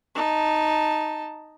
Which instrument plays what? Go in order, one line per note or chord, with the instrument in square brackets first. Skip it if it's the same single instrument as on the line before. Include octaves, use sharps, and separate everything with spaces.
[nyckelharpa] D#4 A5